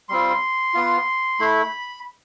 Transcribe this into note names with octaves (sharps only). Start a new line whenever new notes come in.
G3 C4 F4 C6
B3 F4
A3 E4 B5